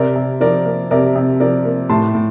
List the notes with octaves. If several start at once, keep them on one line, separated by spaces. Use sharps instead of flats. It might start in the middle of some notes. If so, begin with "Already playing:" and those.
Already playing: C3 A#4 D5
C3
F3 A#4 D5
A#3
C3 A#4 D5
C3
F3 A#4 D5
A#3
A2 A5 C6
A2